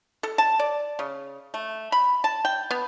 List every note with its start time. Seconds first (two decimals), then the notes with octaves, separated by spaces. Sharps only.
0.23 A4
0.38 A5
0.59 D5
0.99 C#3
1.54 A3
1.92 B5
2.24 A5
2.45 G5
2.71 B3